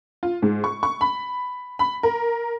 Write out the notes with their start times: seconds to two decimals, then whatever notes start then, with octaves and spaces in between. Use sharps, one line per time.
0.23 F4
0.42 G#2
0.64 C#6
0.83 C#6
1.01 B5
1.79 B5
2.03 A#4